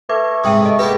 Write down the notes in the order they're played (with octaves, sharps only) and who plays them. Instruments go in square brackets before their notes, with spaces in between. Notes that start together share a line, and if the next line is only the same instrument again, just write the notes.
[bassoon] A3 [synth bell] B4 D6 G#6
[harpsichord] G#2 C3 [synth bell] E5 G5 D#6
[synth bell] D#5
[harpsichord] A#3 B3 G4 [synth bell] G#4 B4